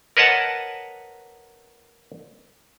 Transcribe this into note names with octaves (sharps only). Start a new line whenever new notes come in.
A#4 B4 C#5 D#5 F#5 A5